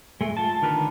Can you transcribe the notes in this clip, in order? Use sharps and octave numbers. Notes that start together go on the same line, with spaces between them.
G#3 A3
F4 A5
D3 D#3 A#4 B4